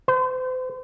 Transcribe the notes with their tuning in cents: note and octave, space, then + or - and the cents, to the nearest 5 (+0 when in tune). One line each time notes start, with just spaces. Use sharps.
C5 -40